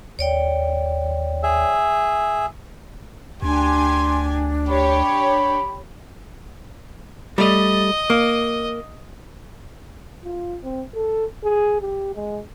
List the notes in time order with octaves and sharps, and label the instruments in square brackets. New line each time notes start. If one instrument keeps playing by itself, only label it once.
[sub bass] D#2 [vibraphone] C#5 D5 G5
[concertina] G#4 E5
[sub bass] D2 [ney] D4 [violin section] G4 G#5 [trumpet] C6
[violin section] G4 C#5 [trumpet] B5
[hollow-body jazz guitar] G3 A3 [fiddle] D#5
[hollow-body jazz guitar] A#3
[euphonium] F4
C4
A4
G#4
G4
G#3